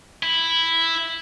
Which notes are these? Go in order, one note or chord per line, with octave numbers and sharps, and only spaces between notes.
E4